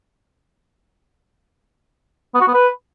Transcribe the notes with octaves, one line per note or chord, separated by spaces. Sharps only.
B3
F#4
B3
B4